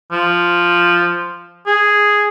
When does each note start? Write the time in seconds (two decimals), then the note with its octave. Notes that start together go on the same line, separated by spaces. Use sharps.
0.11 F3
1.67 G#4